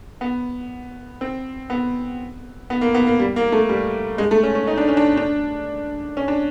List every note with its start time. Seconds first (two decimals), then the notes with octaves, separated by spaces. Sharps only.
0.21 B3
1.21 C4
1.70 B3
2.70 B3
2.81 A#3
2.95 B3
3.07 A#3
3.19 G3
3.36 A#3
3.52 A3
3.69 G3
4.18 G#3
4.31 A3
4.43 C#4
4.55 C#4
4.67 D#4
4.78 D4
4.88 C#4
4.97 D4
5.17 D4
6.17 C#4
6.28 D4